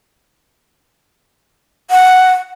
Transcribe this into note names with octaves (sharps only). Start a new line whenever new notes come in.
F#5